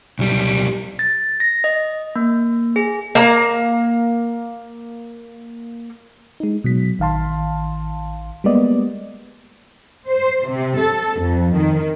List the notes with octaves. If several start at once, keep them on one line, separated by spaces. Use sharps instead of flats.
B1 G3
A6
A#6
D#5
A#3
G#4
A#3 A#5
G#3 D#4
B2 F#3 B6
A1 D#3 F5 A5 C6
G3 G#3 A#3 B3 D5 D#5
C5
C3
A4
F2
D#3